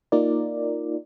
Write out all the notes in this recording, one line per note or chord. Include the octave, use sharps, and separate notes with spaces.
A#3 D#4 F4 A#4 D5